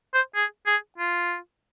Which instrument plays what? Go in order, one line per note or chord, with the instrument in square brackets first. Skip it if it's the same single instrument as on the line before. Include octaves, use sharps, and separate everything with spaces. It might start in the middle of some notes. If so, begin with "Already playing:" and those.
[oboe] C5
G#4
G#4
F4